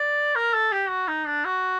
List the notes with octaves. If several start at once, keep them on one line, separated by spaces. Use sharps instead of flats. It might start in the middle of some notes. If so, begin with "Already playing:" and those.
Already playing: D5
A#4
A4
G4
F#4
D#4
D4
F#4